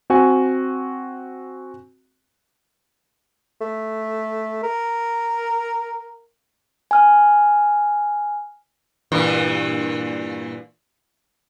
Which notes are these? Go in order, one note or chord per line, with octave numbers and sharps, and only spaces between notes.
C4 F#4 G#5
A3
A#4
G#5 F6
G2 A#2 E3